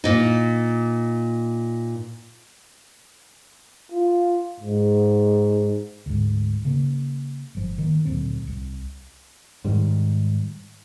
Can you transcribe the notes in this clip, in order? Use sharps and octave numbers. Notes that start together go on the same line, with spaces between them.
A#2 D#4
F4
G#2
D2 G#2
C#3 A#3
G1 F3
D#3 A#3
D2 A#2 F#3 C4
C2
G#2 D#3 G3